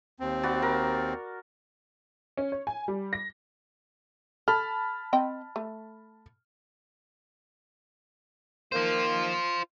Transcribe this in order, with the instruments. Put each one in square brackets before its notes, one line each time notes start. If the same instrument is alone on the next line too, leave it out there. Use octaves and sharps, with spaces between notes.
[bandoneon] D#2 C4
[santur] F#4 B4 D5
A#4
[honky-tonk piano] C#4
C#5
G#5
G3
A#6
[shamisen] A4 [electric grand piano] A5 B5 F6
[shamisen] C4 D#5 G5
A3
[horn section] D#3 A#3 [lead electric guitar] F4 C5